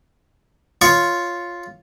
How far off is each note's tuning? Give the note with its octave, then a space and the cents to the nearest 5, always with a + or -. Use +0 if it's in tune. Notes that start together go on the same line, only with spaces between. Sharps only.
F4 +0 C#5 +0 C#6 +0